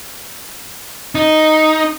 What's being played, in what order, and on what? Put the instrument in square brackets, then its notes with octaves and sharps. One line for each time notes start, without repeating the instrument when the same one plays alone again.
[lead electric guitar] D#4